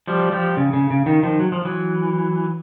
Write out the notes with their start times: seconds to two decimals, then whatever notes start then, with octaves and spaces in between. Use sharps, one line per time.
0.07 F3 G3
0.32 F3 G3
0.57 C#3
0.73 C#3
0.90 C#3
1.06 D#3
1.23 D#3 F3
1.40 F#3
1.52 F3
1.65 E3 F#3